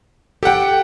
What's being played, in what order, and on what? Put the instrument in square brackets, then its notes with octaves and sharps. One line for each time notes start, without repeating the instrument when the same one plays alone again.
[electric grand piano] G4 F#5 [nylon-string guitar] A4 G5